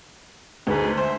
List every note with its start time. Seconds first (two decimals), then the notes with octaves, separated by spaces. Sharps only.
0.67 D2 D#4 G#4 B4
0.97 C5 E5